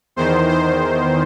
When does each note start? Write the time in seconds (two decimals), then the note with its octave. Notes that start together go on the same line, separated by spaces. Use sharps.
0.16 E2 D#3 C5
0.49 C5